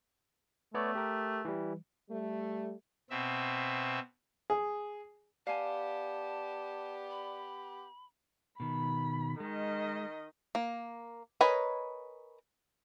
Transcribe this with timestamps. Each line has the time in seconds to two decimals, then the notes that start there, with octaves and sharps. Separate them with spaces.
0.74 A3 B3 C#5 D5
0.95 G4 A#4
1.45 E3 G3
2.10 G3 A3
3.10 B2 C4 E5
4.50 G#4
5.47 B3 G4 D5 F5 G#5 A5
7.10 B5
8.60 B2 D#3 B5
9.40 D#3 G#3 D#5
10.55 A#3
11.41 A#4 B4 C#5 D#5 G#5